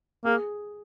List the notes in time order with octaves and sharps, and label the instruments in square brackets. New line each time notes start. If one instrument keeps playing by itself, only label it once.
[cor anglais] A#3 [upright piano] G#4